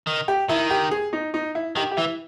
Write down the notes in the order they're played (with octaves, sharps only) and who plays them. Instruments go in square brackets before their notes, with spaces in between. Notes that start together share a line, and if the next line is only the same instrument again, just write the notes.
[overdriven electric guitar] D#3
[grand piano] G4
[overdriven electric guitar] D#3 [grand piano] E4
[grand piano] G4
G#4
D#4
D#4
E4
[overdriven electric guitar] D#3 [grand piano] G4
[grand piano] G4
[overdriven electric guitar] E3 [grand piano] E4